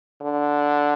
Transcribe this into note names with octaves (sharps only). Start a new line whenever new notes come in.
D3